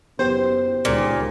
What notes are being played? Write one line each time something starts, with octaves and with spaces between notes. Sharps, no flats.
F#1 B3 G4 C5
C#2 A#2 D#3